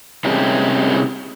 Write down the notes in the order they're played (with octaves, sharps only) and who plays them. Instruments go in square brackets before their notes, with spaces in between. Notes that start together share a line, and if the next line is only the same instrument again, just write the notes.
[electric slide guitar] C3 G3 G#3 C#4 G4 A#4